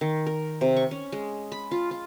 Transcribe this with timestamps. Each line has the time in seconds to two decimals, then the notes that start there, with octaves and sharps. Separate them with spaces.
0.01 D#3
0.27 A#4
0.61 C3
0.77 C#6
0.91 C#4
1.12 G#3
1.52 B5
1.71 F4
1.91 F4